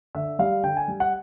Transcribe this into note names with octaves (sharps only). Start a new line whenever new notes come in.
D3 E5
G3 F5
D3 G5
G#5
G3
F#5